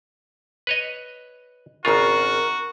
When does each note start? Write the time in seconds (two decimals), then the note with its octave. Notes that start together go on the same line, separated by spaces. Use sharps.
0.67 B4 C#5 D#5
1.85 G#1 C#3 F4 F#4 A#4 A#5 C#6